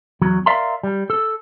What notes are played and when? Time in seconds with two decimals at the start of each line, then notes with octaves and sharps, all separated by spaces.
0.22 E2 F#3
0.46 A#4 D5 E5 F5 A#5 C6
0.83 G3
1.10 A4